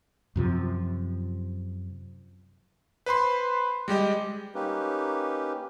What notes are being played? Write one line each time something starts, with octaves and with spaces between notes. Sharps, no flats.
F#2 C3 F3
B4 C5 B5 C6
G3 G#3 G4 D#5
A#3 C#4 D#4 G4 B4